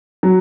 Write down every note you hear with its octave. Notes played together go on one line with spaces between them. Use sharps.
F#3